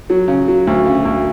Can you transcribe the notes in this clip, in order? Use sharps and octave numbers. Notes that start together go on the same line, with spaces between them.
F#3
C#3
F#3
D2
C#3
D2